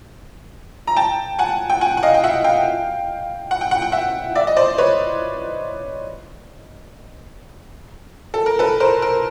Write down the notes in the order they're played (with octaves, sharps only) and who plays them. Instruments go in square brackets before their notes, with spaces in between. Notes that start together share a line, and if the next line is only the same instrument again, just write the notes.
[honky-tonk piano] A#5
G5 A5
F#5 G#5
G5
F#5 G#5
F#5
D#5 F5
G5
E5 F#5
F5 G5
F#5
G5
F#5
G5
E5 F#5
D5 E5
D#5
C5 D5
B4 C#5
A4
A#4
A4 B4
A#4 C5
A#4